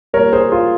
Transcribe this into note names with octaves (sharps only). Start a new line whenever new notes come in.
A#2 G3 A#4 C#5
G#4 C5
F4 G#4